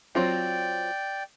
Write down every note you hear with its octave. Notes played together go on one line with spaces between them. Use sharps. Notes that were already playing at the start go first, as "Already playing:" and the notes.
F#3 C4 F4 D5 G5